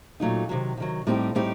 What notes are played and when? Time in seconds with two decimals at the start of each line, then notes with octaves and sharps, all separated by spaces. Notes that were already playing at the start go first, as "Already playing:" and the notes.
0.20 A#2 F#3 A3 D#4
0.49 C3 D#3 F#3
0.77 C3 D#3 F#3
1.07 A2 G3 C4 D#4 G4
1.35 A2 G3 C4 D#4 G4